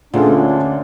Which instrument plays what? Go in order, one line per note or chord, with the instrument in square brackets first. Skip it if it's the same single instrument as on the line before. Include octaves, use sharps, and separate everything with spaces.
[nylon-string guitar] D2 [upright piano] A#2 D3 [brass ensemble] C#4 D4 [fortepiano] F4 G#4 A4